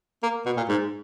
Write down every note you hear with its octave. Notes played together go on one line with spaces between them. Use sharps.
A#3
B2
A#2
G#2